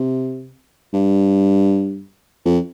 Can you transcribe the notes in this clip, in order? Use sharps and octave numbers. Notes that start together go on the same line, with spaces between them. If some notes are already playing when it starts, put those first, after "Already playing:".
Already playing: C3
G2
F2